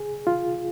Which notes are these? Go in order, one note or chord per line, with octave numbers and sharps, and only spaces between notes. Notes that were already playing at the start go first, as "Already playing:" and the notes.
Already playing: G#4
F4